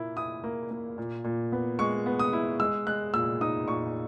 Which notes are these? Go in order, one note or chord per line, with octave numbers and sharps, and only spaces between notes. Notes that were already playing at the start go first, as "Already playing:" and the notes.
Already playing: A#2 A#3 E4
E4 D#6
A#3
A#3
A#2
A#2
B3
G#3 C#6
B3
D#6
E4
G#3 E6
G#3 F#6
A#2 E6
D#4 D#6
A#2 C#6